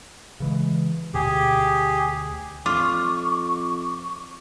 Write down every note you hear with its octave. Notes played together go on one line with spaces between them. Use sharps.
C#3 E3 G#3
D2 B2 G4 G#4
F2 F4 C#6 D6